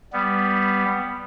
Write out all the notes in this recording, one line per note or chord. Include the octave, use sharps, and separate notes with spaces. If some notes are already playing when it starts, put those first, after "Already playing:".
G3 B3